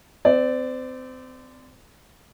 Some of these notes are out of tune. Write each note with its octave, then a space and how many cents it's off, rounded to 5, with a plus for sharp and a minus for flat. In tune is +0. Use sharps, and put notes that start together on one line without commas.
C4 -30 D5 +0